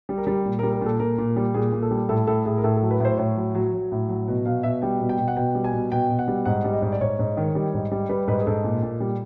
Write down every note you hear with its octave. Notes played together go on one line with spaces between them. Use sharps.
G3
A#4
G3
A#2
G3 A#4
A#4
A#2 A4
A#2 A#4
A#2
G3
A#2 G#4
A#2
A4
G3
A2 A4
A2 A4
A2 G#4
A#4
A2 A4
A4
F#3
B4
A2 C5
A2 C#5
F#3
F#3
F#3
A2
F#3
B2
B2 F5
B2 E5
G3 G5
B2
G5
B2
F#5
B2 G5
G3
G#5
B2
B2 G5
B2
F#5
G3
G#2 F#5
G3
D#5
G#2
D5
G#2 C#5
G#2
D#3
G3
G#2
G3
G3 B4
G#2 B4
G#4
G#2 A4
A#2
A#2
G3